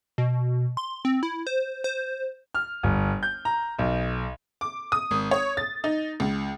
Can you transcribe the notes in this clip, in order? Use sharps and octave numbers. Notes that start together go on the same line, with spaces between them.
B2
C6
C4
E4
C5
C5
F6
G1
G6
A#5
B1
D6
D#6
G#1
C#5
A6
D#4
C#2